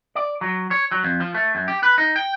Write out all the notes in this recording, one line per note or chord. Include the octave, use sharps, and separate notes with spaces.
D5
F#3
C#5
F#3
F2
F3
A3
F#2
G4
B4
D#4
G5